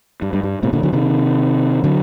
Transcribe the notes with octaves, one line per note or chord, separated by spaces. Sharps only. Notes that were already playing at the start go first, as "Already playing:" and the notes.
G2
G2
G2
A2 C3
A#2 D3
D3 F#3
C3 D#3
D3 F#3